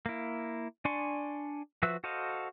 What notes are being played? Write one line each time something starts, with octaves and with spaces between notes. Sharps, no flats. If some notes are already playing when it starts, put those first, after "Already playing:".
A#3 E4
D4 D5 G#5 C6 C#6
F3 F#4 B4 E5 E6
F#4 A4 C5 D#5 F5